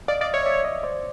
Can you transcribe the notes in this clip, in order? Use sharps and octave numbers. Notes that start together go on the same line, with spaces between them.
D5 D#5 F5
D5 D#5 F5
C#5 D5 E5
D5 E5
C#5 D#5
C5 D5